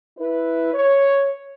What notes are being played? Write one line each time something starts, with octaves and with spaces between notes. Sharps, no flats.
E4 B4
C#5